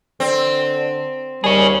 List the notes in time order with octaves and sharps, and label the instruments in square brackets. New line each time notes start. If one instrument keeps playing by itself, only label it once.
[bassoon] D3 [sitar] C4
[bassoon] D#2 [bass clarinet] G3 [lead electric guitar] G#4 C#5